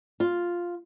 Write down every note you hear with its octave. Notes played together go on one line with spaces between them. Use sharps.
F4